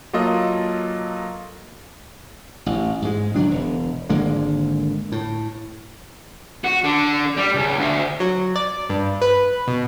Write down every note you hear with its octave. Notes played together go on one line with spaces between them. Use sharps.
F#3 A#3 F4 A4 D#5
A1
G#2 G#3
D3 D#3 F#3 D4
E1
G#1 D3 G#3 A#3
A2
F#4
D3
G3
C#2
D2
F#3
D5
G2
B4
B2